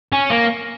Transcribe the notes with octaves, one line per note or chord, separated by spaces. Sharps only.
C#4
A#3